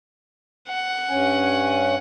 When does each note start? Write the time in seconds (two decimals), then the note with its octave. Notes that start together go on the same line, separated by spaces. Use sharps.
0.69 F#5
1.09 G2 C#4 G#5